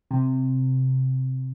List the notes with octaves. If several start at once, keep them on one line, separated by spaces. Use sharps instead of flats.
C3